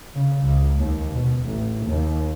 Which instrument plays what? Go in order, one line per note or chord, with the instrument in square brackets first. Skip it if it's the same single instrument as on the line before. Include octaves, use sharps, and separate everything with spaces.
[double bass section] C#3
C#2
D#2
B2
A1
D#2